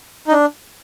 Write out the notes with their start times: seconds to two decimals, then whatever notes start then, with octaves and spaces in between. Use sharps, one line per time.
0.28 D#4
0.32 D4